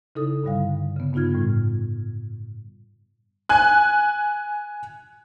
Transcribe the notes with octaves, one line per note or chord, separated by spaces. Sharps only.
C#3 D#4 E4 A4 D#6
G2 D3 G3 F5
C#3 B3
G2 B3 D#4 F4 F6 G#6
A2 G3
G#5 F#6